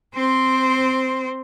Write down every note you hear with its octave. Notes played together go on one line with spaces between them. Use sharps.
C4 C5